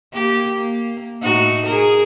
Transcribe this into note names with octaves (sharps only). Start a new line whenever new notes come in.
A#3 G4
A#3
A2 D#4 F#4
G#4 A#4